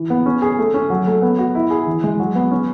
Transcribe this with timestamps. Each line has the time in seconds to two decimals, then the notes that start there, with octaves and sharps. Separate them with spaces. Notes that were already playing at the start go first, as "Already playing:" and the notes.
Already playing: E3
0.10 B3
0.26 C#4
0.42 G#4
0.59 A3
0.74 C#4
0.90 F#3
1.07 A3
1.22 B3
1.38 F#4
1.55 E4
1.70 G#4
1.86 E3
2.04 G#3
2.19 F#3
2.35 B3
2.51 C#4